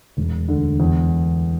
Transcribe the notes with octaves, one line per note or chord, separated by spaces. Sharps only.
E1
D2 D3
E2